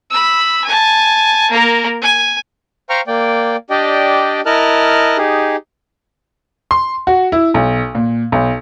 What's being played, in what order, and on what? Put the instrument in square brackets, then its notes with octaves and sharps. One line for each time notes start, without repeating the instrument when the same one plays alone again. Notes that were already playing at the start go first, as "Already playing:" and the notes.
[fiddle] B5 E6
G#5 A5
A#3 A#4
G#5
[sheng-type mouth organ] C5 F5 G5 A#5 C#6 F6
A#3 D5 G5
D4 G4 D5 D#5 G5
E4 A#4 D#5 A5 F6 F#6
D#4 G4 G#4
[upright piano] C6
F#4
E4
B1
A#2
B1